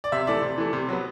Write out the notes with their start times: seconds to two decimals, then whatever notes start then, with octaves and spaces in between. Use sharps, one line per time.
0.04 D5
0.12 C3 E5
0.27 E3 A3 D5
0.42 C3
0.58 E3 A3
0.73 C3
0.89 F#3 B3